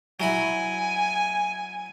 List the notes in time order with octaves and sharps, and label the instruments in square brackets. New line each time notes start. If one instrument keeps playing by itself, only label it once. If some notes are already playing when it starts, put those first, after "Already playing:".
[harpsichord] F#3 E4 B5 [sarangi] G#5